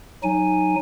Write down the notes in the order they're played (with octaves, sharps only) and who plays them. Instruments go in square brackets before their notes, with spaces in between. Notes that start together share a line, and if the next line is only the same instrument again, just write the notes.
[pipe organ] F#3 D#4 G#5